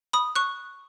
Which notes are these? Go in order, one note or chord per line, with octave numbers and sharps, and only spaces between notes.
B5 D#6
C#6 F#6